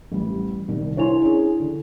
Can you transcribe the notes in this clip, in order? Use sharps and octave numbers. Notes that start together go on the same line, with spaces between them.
A1 G3
C2 D#3
D4 E4 C#5 G#5 C6 F7
C#4 G#4
D3